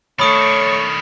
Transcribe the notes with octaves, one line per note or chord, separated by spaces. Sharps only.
D#3 A3 D4 C#5 B5 C#6 D#6 D7